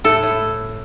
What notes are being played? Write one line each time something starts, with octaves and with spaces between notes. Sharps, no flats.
A2 A4
A2